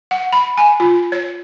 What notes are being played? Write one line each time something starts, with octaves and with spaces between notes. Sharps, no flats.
F#5
B5
G#5
F4
C#5